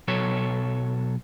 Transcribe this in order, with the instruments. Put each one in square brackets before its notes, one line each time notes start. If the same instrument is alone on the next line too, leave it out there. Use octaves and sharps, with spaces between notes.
[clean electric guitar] B1 F#3 A4 C#5